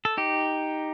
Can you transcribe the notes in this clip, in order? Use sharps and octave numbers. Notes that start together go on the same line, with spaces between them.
A4
D#4 G4